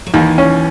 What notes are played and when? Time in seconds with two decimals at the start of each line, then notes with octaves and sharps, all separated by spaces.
0.06 F#3
0.14 D#2 E3
0.38 C#4